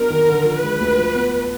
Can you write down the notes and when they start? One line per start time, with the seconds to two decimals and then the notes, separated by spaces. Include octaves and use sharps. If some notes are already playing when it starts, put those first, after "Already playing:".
Already playing: F#3 B3 D4 A#4
0.10 D#3
0.28 D3
0.45 F3
0.63 G#3 B4
0.80 D2
0.98 F3
1.16 B3